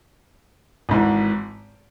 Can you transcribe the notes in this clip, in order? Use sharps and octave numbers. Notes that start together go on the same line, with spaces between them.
G#1 G#2 E3